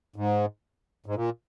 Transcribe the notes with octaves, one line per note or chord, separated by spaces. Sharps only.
G#2
G#2
A#2